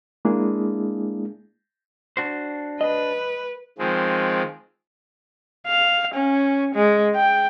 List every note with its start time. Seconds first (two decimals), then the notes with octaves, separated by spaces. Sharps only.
0.25 G#3 A#3 D4 E4 G#4
2.17 D4 F#4 C5
2.81 B4 D#5
3.78 D#3 F3 G#3 C4
5.67 F5
6.14 C#4
6.75 G#3
7.16 G5